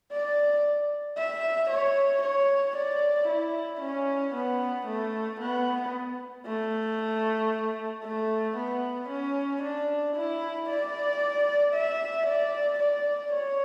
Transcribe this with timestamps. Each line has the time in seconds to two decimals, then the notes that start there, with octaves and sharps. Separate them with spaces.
0.12 D5
1.17 E5
1.70 C#5
2.23 C#5
2.76 D5
3.28 E4
3.82 C#4
4.34 B3
4.87 A3
5.40 B3
6.46 A3
8.03 A3
8.57 B3
9.09 C#4
9.62 D4
10.16 E4
10.68 D5
11.74 E5
12.26 D5
12.79 D5
13.32 C#5